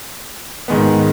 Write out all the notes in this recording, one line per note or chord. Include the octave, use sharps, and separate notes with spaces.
G#2 D#3 G#3 B3